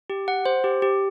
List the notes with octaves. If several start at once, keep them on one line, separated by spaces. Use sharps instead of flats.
G4
F#5
C5
G4
G4